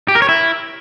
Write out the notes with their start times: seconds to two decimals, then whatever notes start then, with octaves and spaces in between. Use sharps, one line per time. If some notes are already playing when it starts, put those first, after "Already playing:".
0.08 G4
0.15 A#4
0.22 C#5
0.29 E4